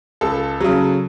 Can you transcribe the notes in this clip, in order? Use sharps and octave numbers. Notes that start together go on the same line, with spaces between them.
C#2 A4
C#3 F#3